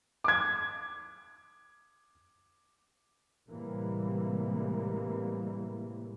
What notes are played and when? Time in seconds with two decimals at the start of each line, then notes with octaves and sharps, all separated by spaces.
0.24 D6 G#6
3.49 A2 C3 E3 G3 G#3 A#3